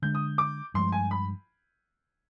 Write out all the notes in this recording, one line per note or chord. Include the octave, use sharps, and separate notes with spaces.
D3 G#3 D4 G6
D#6
D6
G2 F3 G#3 C6
G#5
B5